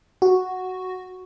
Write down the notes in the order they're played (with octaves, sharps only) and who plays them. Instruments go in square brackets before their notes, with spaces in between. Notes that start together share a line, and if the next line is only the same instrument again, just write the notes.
[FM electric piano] F#4